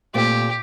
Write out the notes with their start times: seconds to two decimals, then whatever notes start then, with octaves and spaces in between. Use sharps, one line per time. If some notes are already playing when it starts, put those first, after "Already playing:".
0.14 A#2 A3 C4 G4